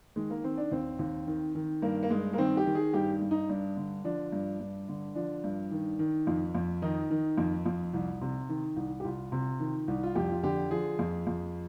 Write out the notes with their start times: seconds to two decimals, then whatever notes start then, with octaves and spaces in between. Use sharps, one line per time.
0.16 D#3 G#3
0.30 A#3
0.44 D#3 C4
0.57 D4
0.72 D#2 C4
0.99 D#2
1.27 D#3
1.55 D#3
1.82 G2 A#3
2.03 A#3
2.10 G2 G#3
2.33 A#3
2.38 D#3 C4
2.57 G4
2.66 D#3
2.75 G#4
2.93 G2 G4
3.21 G2
3.31 D#4
3.49 G2 D4
3.77 D3
4.04 F3 D4
4.32 G2
4.60 G2
4.88 D3
5.15 F3 D4
5.44 G2
5.71 D#3
5.99 D#3
6.27 F2
6.55 F2
6.82 D#3 D#4
7.11 D#3
7.38 F2
7.66 F2
7.93 C2
8.21 C3
8.49 D#3
8.76 C2
9.00 G4
9.04 C2 F4
9.32 C3
9.60 D#3
9.88 C2
10.03 F4
10.15 F2 G4
10.31 F4
10.43 D3 G4
10.71 F3 G#4
10.99 F2
11.27 F2